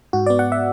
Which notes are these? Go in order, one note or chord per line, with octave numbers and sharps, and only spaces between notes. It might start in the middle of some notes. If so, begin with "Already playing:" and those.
G#2 F#4
B3 D5
F#5
E5